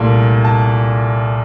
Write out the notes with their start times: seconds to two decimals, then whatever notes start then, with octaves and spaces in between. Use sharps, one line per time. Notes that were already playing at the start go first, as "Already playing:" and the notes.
Already playing: C2 A#2 A3
0.45 A5